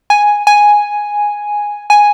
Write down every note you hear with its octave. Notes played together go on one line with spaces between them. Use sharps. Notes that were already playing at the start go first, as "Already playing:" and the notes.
G#5
G#5
G#5